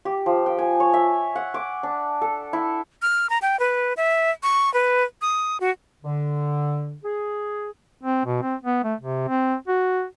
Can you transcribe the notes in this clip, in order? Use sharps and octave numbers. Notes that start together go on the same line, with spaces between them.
G4
F3
G5
G#5
C#5
E5
F#5
D6
D4
A4
E4
F6
A#5
G5
B4
E5
C#6
B4
D#6
F#4
D3
G#4
C4
B2
C4
B3
A3
C3
C4
F#4